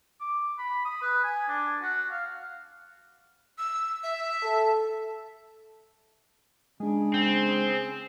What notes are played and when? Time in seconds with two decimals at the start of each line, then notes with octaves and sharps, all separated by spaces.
0.20 D6
0.58 B5
0.85 D#6
1.02 B4
1.24 G#5
1.48 D4
1.82 F#4
2.12 F5
3.58 E6
4.03 E5
4.43 A4
6.80 C#3 G#3 D4 G#4
7.14 C4